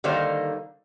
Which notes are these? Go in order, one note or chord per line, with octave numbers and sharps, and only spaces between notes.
D3 D#3 G3 A#3 D#4 C5